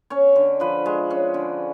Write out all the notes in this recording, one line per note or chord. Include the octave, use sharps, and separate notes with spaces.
C#4 C#5
D3
F3 B4
G#3
C#4
D3